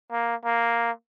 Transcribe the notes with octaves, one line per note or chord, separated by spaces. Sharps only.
A#3
A#3